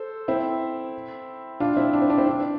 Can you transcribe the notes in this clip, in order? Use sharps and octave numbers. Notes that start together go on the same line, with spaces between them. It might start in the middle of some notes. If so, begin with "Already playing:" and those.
Already playing: A4 C5
C4 E4
D4 F4
C4 E4
D4
C4
D4
C4 E4
D4